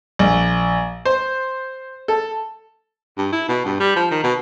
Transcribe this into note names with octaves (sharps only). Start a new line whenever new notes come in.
A#1
C5
A4
G2
E4
B2
G2
G3
F3
D#3
B2